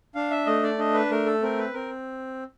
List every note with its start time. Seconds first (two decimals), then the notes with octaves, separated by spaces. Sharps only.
0.15 D4 F5
0.30 E5
0.46 A3 D#5
0.63 D5
0.79 D4 D#5
0.94 B4
1.11 A3 A#4
1.26 A4
1.42 C4 A#4
1.58 B4
1.74 C4 A#4